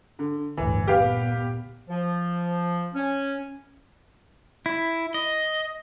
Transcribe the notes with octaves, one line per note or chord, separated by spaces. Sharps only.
D3
G1 D2 A2 E3
A#2 B3 G4 B4 F5
F3
C#4
E4
D#5